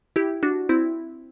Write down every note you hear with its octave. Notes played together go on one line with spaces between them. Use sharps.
E4 G4
D4 F#4
C4 E4